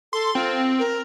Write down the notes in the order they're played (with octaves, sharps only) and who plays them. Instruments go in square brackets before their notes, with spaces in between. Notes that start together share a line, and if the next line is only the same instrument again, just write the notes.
[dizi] A4 [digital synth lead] C6
[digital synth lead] C4 [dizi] F4
[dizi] A#4